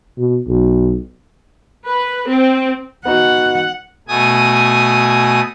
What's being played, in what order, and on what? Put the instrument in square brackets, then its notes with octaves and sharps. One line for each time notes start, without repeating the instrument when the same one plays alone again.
[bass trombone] B2
B1
[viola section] B4
C4
[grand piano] B3 D#4 F#4 [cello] F#5
[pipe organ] B2 A3 G#5 D#6